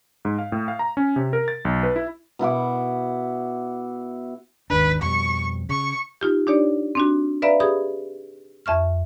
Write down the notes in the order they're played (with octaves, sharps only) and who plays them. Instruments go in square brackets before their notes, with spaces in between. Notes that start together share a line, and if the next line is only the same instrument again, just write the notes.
[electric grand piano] G#2
F5
A2
F5
A#5
C#4
C3
A#4
A6
B1
B4
E4
[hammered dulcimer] B2 E4 F#5 D6
[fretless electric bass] G#1 D#2 D4 [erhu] B4
[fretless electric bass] F2 B2 G3 [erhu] C#6
[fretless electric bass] C#3 [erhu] C#6
[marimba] D#4 F4 G4
D4 D#4 G4 C#5 D5
C4 D4 F#4
B4 D5 E5 F5 A#5 B5
G4 G#4 B5 D#6
F2 E5 C#6 F6